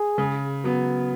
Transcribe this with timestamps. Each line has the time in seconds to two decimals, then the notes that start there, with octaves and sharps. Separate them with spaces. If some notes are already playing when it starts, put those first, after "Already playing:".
Already playing: G#4
0.18 C#3
0.64 F#3 B3